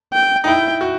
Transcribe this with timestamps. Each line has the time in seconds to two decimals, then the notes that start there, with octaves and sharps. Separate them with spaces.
0.13 G5
0.44 D#4
0.47 E4 G5
0.81 F#4